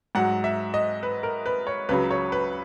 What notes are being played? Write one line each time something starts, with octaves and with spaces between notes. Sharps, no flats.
G#2 F#3 F#5
E5
D#5
B4
A#4
B4
C#5
C#2 C#3 F#3 B4
C#5
B4